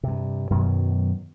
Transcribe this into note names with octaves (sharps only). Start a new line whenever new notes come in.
G2 C3
F#2 B2 D#3 F#3